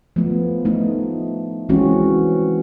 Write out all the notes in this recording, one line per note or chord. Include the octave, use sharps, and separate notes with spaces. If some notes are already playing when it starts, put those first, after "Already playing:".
F3 A3 B3
A3 D#4
E3 G#3 C4 C#4 F#4